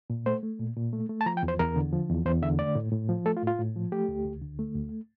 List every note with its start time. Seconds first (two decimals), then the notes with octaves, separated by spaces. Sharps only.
0.10 A#2
0.26 A3 C5
0.43 A3
0.60 A#2
0.76 A#2
0.93 A3
1.09 A3
1.21 A5
1.26 F3 A#5
1.37 G5
1.43 E2
1.48 C5
1.59 E2 A#4
1.76 D3
1.93 F3
2.09 E2
2.26 E2 C5
2.42 D3 E5
2.59 A3 D5
2.75 A2
2.92 A2
3.09 F3
3.26 A3 A4
3.37 F4
3.42 A2
3.47 F4
3.59 A2
3.76 F3
3.92 A3 G4
4.08 D2
4.25 D2
4.42 D3
4.59 A3
4.76 D2